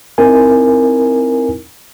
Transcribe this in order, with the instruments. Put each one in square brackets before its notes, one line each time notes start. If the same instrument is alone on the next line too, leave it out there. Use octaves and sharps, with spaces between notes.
[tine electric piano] C4 D#4 E4 A#4 G#5